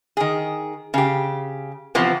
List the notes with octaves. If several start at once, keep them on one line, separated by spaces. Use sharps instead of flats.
D#3 G#4
C#3 G4
C3 E3 F3 B3